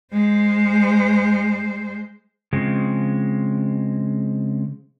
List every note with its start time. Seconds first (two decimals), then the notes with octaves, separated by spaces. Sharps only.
0.13 G#3 C5
2.53 C#3 F3 G#3 C4